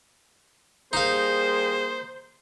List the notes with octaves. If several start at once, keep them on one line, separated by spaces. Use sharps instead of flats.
G3 A#3 D#4 G#4 C5 F5